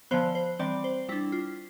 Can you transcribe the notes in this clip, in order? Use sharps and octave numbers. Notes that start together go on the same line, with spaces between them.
D3 F3 B3 C5
C5
E3 G3 C4 D5
C5
G3 D4 E4
F4